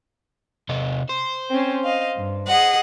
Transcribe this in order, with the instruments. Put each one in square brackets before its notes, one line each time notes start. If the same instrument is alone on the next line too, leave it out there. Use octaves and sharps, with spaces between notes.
[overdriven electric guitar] C3 D#4
C5
[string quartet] C4 C#4
D#5 F5
G2
[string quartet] G#4 D#5 [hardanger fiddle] F#5